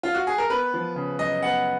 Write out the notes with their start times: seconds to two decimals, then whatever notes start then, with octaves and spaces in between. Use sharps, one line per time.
0.03 F4
0.14 F#4
0.27 G#4
0.38 A#4
0.50 B3 B4
0.74 F3
0.96 C#3
1.19 F#2 D#5
1.42 B3 F#5